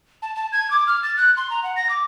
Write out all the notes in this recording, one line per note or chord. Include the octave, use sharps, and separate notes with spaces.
A5
A5
G#6
D6
F6
A6
F#6
C6
A#5
F#5
A#6
D6